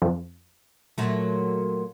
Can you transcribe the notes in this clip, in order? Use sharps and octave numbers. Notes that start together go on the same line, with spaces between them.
F2
A#2 F#3 A3